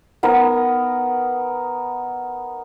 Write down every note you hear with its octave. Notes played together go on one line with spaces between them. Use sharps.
B3 D#4 A#4